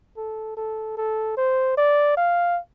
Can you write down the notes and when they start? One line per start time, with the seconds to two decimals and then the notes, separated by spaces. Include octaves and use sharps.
0.17 A4
0.57 A4
0.97 A4
1.37 C5
1.77 D5
2.17 F5